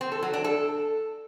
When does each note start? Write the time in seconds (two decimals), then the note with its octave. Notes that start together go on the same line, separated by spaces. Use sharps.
0.01 C4
0.12 A4
0.23 F#3
0.33 D4
0.44 A4